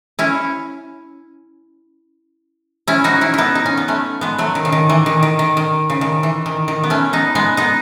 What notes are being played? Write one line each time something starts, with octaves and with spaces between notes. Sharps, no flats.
C#4 E4
C#4 E4
D#4 F#4
C#4 E4
B3 D#4 E4
D#4
C#4
B3
A3 C#4
G#3 B3
F#3 A3
D#3
C#3
D#3
E3
D#3
D#3
D#3
D#3
C#3
D#3
E3
D#3
D#3
B3
A3 C#4
B3 D#4
G#3 B3
B3 D#4